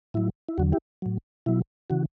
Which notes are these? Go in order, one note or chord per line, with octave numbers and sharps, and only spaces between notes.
A2 F#3 E4
E4
E2 D3 F#3 F#4
E4 G4
A2 F#3
B2 F#3 E4
C#3 E3 F#4